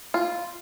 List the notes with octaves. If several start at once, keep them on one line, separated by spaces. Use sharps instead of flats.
F4